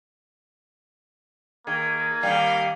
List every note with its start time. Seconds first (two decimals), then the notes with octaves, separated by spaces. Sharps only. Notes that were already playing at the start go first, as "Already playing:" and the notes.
1.67 D#3 A#3 G#4
2.23 D#3 G3 F5 G#5